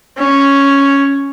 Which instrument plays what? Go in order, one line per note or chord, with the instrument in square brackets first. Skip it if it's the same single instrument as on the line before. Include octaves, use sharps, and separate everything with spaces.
[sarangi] C#4